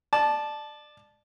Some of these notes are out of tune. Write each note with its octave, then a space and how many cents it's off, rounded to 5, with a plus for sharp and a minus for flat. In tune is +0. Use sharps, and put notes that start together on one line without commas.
D5 +25 A5 -10